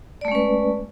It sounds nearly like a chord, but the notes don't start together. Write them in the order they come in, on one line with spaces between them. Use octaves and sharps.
D5 A3 G#3 C#4 B4